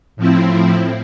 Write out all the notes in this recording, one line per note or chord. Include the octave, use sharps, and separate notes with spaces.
A2 F3 C4 E4